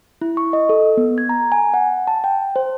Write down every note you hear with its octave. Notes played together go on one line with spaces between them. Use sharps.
E4
C#6
D#5
A4
B3
G#6
A#5
G#5
F#5
A5
G5
C5